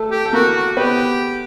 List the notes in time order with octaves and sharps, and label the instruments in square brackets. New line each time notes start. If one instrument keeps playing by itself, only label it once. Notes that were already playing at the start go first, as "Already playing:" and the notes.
Already playing: [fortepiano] A3 A4
[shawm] G4
[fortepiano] A4
[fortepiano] A#3 A#4 [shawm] F#4
[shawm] F#4
[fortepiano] B3 B4 [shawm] G4